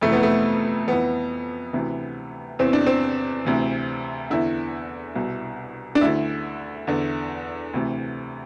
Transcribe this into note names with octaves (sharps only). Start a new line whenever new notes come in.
F2 C3 E3 A3
B3
A3
F2 E3 B3
D2 C3 E3
E2 C3 E3 C4
D4
C4
D2 C3 E3
E2 D3 E4
C2 B2
D4
D2 D3 E4
E2 D3
D2 C3 E3